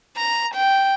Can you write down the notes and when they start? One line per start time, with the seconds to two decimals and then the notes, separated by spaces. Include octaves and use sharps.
0.17 A#5
0.54 G5